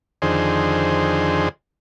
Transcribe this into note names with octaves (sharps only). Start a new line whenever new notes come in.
F2 D3 D#3 G#4 C5